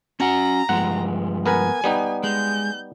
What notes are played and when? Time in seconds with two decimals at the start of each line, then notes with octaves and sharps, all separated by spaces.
0.20 C#4 F#4 F#5 A#5
0.69 G2 F3 G#3 F#5
1.46 B3 A#4 B4 G#5
1.84 G3 B3 D#4
2.23 G#3 G6